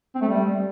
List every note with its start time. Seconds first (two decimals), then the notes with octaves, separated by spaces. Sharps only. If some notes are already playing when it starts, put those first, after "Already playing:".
0.15 C4
0.21 A3
0.28 G3